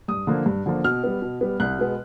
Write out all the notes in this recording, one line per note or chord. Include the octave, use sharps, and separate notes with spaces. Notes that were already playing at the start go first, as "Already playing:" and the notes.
G2 D#6
D3 F3 A#3
G2
D3 F3 A#3
B2 F6
G3 B3
B2
G3 B3
C2 F#6
B2 G#3 B3